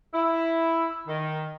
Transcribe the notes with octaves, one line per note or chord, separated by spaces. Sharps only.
E4
D#3